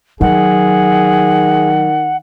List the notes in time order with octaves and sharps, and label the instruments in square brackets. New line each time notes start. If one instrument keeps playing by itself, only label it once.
[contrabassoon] D#3 [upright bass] F#3 [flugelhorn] G#4 [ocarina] F#5